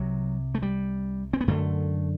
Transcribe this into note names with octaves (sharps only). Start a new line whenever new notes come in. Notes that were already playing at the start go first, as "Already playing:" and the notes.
Already playing: C2 C3 F#3
A3
G3
C4
B3
F#2 D3 A3